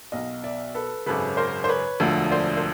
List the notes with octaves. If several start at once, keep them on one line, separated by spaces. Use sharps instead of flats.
B1 B2 D#5 F5
D5 E5
A4 B4
G#1 F#2 C#3 A4 B4
A#4 C5
C5
B4 C#5
E1 D2 D3 F3
C5 D5
C5